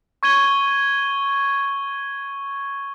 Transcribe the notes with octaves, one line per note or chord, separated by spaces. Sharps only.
C#6 G#6 D#7 G7